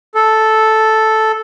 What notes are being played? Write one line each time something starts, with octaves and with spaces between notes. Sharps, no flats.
A4